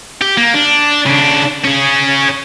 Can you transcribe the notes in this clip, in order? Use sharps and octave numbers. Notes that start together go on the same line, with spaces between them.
G4
A#3
D4
C#3 D4
C#4 G#4